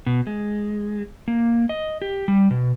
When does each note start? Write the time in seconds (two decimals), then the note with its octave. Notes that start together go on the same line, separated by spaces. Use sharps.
0.06 B2
0.27 G#3
1.28 A#3
1.69 D#5
2.02 G4
2.28 G3
2.51 B2